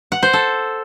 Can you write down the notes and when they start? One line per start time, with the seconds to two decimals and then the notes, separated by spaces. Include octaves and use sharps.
0.12 F#5
0.23 C5
0.33 A4